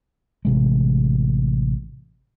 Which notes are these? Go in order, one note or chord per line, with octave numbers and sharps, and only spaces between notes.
A1 C3 G#3